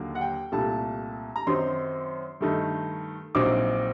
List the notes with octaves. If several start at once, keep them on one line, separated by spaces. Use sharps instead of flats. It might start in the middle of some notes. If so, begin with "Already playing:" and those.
Already playing: D#2 D3 F#3 A#3
F#5
G5
C2 A#2 A3 A5
A#5
F#2 D#3 F#3 C4 D#4 C6
G2 D#3 A3 D#4
A#1 A#2 F#3 C4 D#4 D6